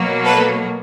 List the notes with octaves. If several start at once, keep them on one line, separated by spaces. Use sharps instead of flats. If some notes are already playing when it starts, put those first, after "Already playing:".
Already playing: B2 F#3 A#3
A4 B4